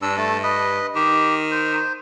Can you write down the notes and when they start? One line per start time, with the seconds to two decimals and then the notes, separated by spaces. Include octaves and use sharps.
0.02 G2 D4 E6
0.17 A3 A5
0.43 B4 D#5
0.95 D#3 G4
1.51 C5